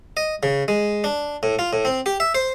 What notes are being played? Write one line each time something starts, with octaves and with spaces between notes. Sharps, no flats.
D#5
C#3
G#3
D4
A2
F4
A2
C4
G4
E5
C5